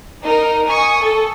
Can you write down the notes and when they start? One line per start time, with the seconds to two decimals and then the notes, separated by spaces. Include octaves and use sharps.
0.23 D#4 A#4
0.67 G#5 C#6 D#6
1.01 A4